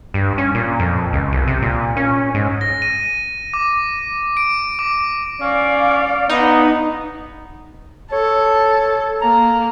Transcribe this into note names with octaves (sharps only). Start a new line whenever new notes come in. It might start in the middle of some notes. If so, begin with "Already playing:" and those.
G2
C#4
A#2
F2
C#2
C2
C3
A#2
C#4
G#2
A#6
D#7
D6
D7
D6
C#4 D5 F5
B3 D#4
A4 C#5
A#3 A#5